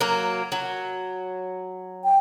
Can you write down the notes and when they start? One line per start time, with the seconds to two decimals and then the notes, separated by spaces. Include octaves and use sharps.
0.01 F#3 A#3
0.52 F#3
2.04 G5